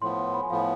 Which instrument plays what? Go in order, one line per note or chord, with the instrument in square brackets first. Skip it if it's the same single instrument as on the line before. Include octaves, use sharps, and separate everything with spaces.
[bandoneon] A2 F3 B3 [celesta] C6
[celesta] B5
G#5
[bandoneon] A2 F3 B3 [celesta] F5